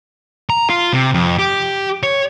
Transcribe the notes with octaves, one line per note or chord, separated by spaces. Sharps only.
A#5
F4
C3
F2
G4
C#5